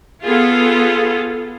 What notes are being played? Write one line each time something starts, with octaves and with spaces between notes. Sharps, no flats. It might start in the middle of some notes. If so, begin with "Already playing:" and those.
B3 F4 G#4 A4